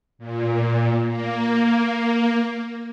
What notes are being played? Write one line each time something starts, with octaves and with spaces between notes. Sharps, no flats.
A#2
A#3